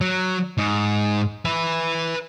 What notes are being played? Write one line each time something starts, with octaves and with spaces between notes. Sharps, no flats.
F#3
G#2
B4 E5